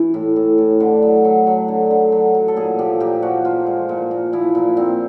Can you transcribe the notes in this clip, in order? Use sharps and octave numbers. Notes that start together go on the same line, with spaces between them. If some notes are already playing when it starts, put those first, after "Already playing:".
Already playing: E3
A2
A2
A2
D3
F#3
F#3
F#3
D3
D3
F#3
F#3
A4
A#2 G#4
F3 G4
A#2 G4
F3 F#4
F3 F4
G#3
A#2
A#2
F3 E4
A#2
A#2 C4